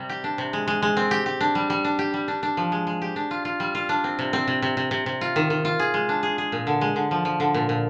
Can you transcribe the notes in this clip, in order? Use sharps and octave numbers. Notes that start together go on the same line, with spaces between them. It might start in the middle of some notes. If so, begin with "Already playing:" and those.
Already playing: C3 G3
G4
D4
C3
G#3
G#3
G#3
C4
G4
G4
D4
G3
G3
D4
G4
G3
D4
D4
F3
G#3
G#3
G4
D4
F4
F4
G3
F4
D4
C4
C3
C4
C3
C3
C3
C3
C3
F4
D#3
D#3
F4
G#4
G#3
D4
G#4
G#4
A#2
D3
G#3
D3
F3
F3
D3
A#2
A#2